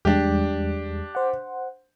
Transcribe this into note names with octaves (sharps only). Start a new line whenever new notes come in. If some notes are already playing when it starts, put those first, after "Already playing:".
E2 G3 G#3 D4 G4
C5 F#5